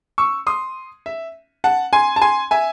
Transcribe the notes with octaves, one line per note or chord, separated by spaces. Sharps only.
C#6 E6
C6 D#6
E5
F#5 A5
G#5 C6
A5
G#5 C6
E5 G#5